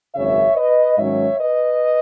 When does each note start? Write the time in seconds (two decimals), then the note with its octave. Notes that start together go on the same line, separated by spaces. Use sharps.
0.15 G#1 F#2 C#3 C#5 E5
0.56 B4 D#5
0.98 G#2 D#3 F#3 C#4 C#5 E5
1.39 B4 D#5